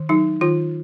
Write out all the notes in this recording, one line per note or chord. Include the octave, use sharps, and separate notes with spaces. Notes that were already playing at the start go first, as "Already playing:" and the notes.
Already playing: D#3
F#3 D#4
D#3 F4